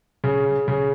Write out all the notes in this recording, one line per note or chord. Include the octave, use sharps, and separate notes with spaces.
C#3
C#3